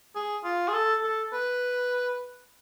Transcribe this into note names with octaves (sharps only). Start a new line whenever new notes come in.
G#4
F4
G#4
A4
A4
B4